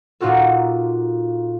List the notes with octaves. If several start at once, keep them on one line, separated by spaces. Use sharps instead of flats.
A#2 D#4 F4 F#4 A4